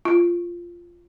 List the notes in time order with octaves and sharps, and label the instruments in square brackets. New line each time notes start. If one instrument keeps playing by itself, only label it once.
[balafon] F4